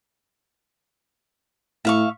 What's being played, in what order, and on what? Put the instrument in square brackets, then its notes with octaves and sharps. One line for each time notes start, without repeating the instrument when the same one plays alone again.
[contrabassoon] A2 [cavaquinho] E5 F5 C#6